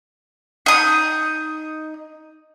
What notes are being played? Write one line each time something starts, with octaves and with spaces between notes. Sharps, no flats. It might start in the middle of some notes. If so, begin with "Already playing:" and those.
D#4 D#6